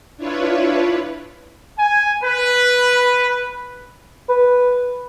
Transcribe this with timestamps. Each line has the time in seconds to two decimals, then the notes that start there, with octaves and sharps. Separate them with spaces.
0.17 D4 E4 F4 B4 C#5
1.78 G#5
2.24 B4
4.29 B4